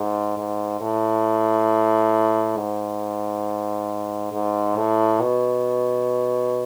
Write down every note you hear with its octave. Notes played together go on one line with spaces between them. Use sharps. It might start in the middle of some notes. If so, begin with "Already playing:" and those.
Already playing: G#2
G#2
A2
G#2
G#2
A2
B2